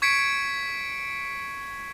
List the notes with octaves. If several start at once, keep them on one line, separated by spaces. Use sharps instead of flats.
C#6 G#6 B6 C#7 D7